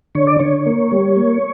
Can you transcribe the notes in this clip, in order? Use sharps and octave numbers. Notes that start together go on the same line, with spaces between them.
D3 C#5
D5
D3 C#5
A#3
G3
A#3